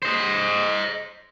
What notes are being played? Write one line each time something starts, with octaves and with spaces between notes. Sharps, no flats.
C5 D#5